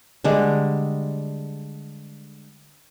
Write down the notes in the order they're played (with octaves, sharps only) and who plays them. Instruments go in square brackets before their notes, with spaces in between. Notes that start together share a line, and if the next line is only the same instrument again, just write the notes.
[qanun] D3 G3 G#3